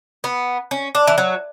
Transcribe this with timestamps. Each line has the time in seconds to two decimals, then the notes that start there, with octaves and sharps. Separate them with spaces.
0.24 B3
0.71 C#4
0.95 D4
1.07 E3
1.18 F#3